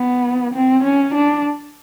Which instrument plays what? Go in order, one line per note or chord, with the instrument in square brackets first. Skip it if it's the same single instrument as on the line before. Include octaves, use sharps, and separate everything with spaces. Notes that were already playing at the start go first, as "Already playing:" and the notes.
Already playing: [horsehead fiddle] B3
C4
C#4
D4